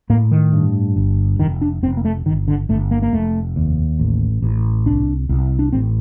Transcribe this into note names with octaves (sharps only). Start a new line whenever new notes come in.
A2 A#3
D#3
G2
G1
F1 D#3
D4
F1 C4
A#3
A3
G1 D#3
D3
G1 A3
A#3
A#3
F1 A3
D#2
A1
A1
C2 D4
C2
D4
A1 C4